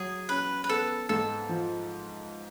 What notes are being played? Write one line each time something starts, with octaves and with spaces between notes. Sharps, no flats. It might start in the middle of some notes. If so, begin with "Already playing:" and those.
Already playing: F#3 G#4
C#4 B4
B4
B3 A4
G#2 A4
F3